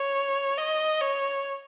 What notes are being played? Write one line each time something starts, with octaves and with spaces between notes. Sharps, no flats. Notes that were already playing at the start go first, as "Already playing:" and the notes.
Already playing: C#5
D#5
C#5